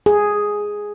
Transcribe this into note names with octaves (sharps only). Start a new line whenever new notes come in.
G#4